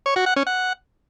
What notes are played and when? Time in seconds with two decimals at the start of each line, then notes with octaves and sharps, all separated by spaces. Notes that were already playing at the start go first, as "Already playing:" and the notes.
0.06 C#5
0.16 F#4
0.26 F#5
0.36 C#4
0.47 F#5